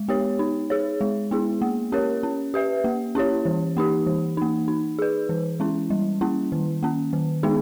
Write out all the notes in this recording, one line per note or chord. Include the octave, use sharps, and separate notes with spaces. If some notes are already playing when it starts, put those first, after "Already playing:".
Already playing: G#3
B3 G4 C#5
D#4
G#4 C#5
G#3
B3 E4 G#4
A#3
C#4 G4 A#4 C#5
C#4
G4 B4 E5
A#3
C#4 E4 G4 C#5
E3
A#3 D#4 G4
E3
A#3 D#4
D#4
G#4 B4
E3
G#3 C#4 E4
G3
A#3 C#4 E4
D#3
A#3 C#4
D#3
G#3 B3 D#4 G#4